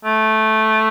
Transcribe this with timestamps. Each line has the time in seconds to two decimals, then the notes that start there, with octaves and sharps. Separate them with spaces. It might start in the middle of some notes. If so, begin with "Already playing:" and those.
0.05 A3